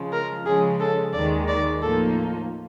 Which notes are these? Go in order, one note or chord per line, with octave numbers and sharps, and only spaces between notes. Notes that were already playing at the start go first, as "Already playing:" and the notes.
Already playing: C#3 F3 G#3
A#4
C#3 F3 G#3 C#4 G#4
A4
D#2 D#3 G#3 D5
D5
A2 F3 A#3 D#4 A4